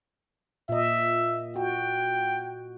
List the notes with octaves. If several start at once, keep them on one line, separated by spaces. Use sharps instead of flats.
A#2 D#5 E5
F#4 G5